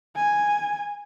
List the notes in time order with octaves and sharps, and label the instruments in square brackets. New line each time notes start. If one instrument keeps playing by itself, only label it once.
[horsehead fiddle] G#5